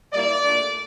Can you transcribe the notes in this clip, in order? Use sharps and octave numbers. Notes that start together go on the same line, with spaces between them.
A#2 G3 A#3 E4 D5
A#2 A3 D4